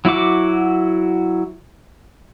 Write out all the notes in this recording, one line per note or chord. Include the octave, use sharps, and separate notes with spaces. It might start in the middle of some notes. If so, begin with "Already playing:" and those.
F#3 E4 F#4 D6